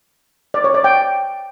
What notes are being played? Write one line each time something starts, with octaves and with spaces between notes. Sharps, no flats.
D5
C#5
D5
G5